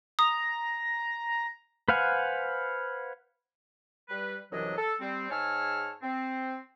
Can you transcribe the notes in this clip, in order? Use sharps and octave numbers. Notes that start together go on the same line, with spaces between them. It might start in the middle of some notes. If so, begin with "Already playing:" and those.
A#5 D#6
B4 C5 F5 F#5 G#5
G3 B4
C2 F#2 E3 F#3 D4 D#5
A4
G3 C4
G#2 G#4 C#5 A5 E6 F6
C4